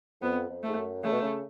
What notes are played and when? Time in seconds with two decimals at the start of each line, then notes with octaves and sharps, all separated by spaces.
0.22 F2 B3
0.49 F2
0.63 G#2 A3
0.76 F#2
1.03 C#3 A3
1.12 B2
1.21 C#3